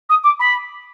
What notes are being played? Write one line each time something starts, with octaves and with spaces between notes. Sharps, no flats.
D#6
D6
B5